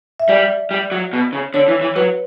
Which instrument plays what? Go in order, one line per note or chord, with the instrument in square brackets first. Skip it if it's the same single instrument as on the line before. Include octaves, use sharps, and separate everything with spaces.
[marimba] E5
[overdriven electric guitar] G3 [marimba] D5
[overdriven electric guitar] G3
F#3
B2
C#3
[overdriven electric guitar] D3 [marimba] C#5
[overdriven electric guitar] E3
E3
[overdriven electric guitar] F#3 [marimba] B4